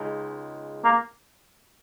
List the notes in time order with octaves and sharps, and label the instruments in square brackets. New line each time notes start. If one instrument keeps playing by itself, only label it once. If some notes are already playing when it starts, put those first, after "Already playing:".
Already playing: [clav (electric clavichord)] C#2 C#3 G#3 D#4
[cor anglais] A#3